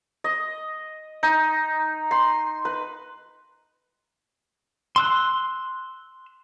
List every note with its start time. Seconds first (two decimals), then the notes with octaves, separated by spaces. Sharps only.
0.24 D#5
1.23 D#4
2.11 C6
2.65 B4
4.96 C6 E6 F#6